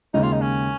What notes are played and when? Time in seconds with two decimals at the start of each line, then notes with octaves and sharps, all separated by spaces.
0.14 D#2 C#3 G#3 D#4
0.23 F4
0.32 D#4
0.42 C#4